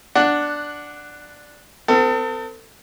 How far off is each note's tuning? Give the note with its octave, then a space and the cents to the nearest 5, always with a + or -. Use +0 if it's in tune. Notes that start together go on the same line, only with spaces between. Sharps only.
D4 +0 F#5 +0
C4 -40 A4 +35